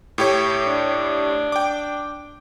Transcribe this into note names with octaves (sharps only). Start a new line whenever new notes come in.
A2 G4 C#5
D4
G5 D6